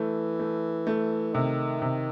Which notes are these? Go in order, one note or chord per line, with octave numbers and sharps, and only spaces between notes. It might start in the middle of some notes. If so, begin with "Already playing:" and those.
Already playing: E3 A3
A3
A3
C3 D#3
C3